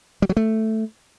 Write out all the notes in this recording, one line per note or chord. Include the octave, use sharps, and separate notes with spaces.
G3
F#3
A3